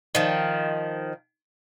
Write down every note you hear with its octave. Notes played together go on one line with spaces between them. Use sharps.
D#3 F3